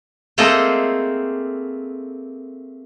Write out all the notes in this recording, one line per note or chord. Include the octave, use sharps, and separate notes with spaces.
A3 A#3 C4 G#4 A4 D#5